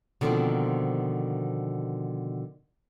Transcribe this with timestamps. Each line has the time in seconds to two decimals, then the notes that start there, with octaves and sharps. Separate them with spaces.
0.21 B2 D3 D#3 F3 A#3 C4